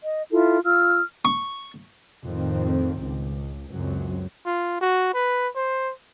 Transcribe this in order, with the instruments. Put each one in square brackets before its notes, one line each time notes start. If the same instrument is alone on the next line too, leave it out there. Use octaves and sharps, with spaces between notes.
[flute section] D#5
E4 F4 A4
F4 E6 F6
[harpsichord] C#6
[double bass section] F2 A2 D#3 C4
C#2
C#2 F#2 F#3 C4
[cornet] F4
F#4
B4
C5